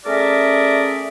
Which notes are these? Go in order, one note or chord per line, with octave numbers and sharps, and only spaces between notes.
A3 C#4 G#4 A#4 D5 E5